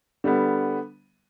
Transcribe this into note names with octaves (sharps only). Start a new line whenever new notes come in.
D3 G3 B3